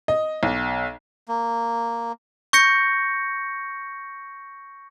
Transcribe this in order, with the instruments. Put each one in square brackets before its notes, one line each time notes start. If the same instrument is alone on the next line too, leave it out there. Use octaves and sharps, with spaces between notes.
[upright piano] D#5
B1
[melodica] A#3
[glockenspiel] C#6 G6 A#6 C#7